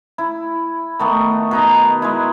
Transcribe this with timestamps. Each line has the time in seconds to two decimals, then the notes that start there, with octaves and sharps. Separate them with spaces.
0.18 E4
0.99 D#3 A3 B3
1.51 B2 D#4 A#5
2.02 G#3 E4